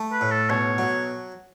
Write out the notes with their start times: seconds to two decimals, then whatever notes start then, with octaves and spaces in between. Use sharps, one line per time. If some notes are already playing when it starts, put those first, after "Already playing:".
Already playing: A3
0.12 B4
0.21 A2
0.31 A4
0.50 B1 C#5
0.78 F#3